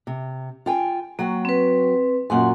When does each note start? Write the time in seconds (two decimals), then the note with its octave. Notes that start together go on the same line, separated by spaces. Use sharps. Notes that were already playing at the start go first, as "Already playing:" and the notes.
0.07 C3
0.66 F4 G5 G#5
1.19 F#3 A#3 F#4 G5
1.45 C4 B4
2.30 F#2 A#2 F#4 F#5 G#5 C6